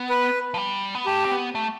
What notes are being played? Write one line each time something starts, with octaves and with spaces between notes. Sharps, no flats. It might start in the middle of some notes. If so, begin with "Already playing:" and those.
Already playing: B3
B4
F3
G3
B3
A3 G4
C4
B3
A3